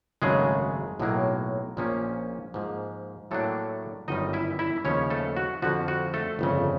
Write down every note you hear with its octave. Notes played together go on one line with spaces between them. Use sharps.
G#1 F#2 C#3 F#3 G#3 A3 G#4
B1 A2 F#3 A#3
A#1 A#2 F3 A#3 C#4
G#2 F3 A#3
A2 F#3 A3 A#3 D4 A4
G1 F#2 D#3 G3 D#4 D#5
E4 E5
E4 E5
D#2 C#3 F3 C#4 C#5
A3 A4
F#4
F2 D3 F3 F#4
F#4
A3 A4
G1 F2 C#3